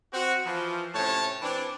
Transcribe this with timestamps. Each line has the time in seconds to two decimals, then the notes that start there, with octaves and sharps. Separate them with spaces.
0.13 C4 F#4
0.45 E3 F3
0.95 A2 C3 C#4 C#5 A5
1.42 E3 C4 D4